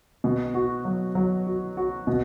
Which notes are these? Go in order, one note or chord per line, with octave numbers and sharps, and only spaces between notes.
B2
F#4
F#3
F#3
F#4
F#4
B2